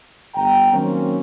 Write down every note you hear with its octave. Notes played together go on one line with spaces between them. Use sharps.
G1 G5 A#5
D#3 F#3 A#3 C4 C#4